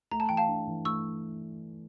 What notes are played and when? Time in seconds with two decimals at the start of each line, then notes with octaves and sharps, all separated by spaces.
0.11 A3 A#5
0.20 A5
0.29 E3 G5
0.37 F5 A5
0.48 D4
0.67 E3
0.85 A3 C#6 E6